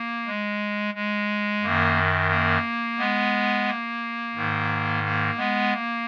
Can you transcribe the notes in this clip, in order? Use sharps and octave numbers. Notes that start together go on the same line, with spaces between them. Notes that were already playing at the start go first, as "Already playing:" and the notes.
Already playing: A#3
G#3
G#3
F#2 D#3 A#3
A#3
G#3 B3
A#3
G#2 D#3
A#3
G#3 B3
A#3